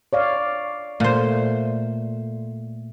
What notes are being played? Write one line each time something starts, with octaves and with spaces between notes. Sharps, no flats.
C#5 D5 F5
A#2 A3 C5